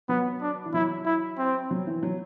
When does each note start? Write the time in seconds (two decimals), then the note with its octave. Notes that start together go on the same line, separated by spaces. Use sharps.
0.09 F#3 B3
0.41 D4
0.66 E3
0.74 F#3 E4
1.05 E4
1.38 C4
1.70 F#3
1.87 E3
2.03 F#3